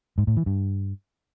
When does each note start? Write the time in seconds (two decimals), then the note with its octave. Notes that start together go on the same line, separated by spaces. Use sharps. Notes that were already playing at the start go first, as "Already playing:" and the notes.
0.18 G#2
0.27 A2
0.37 E3
0.46 G2